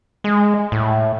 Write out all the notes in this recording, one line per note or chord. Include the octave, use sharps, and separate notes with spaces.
G#3
A2